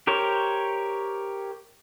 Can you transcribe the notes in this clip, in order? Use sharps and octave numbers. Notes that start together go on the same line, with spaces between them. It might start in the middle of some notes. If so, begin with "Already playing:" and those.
G4 A#4 C5 C#5